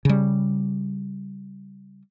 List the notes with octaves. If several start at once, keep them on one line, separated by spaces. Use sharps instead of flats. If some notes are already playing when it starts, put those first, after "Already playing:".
C#3 G3